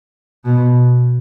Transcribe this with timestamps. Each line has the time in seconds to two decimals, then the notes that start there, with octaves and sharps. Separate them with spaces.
0.45 B2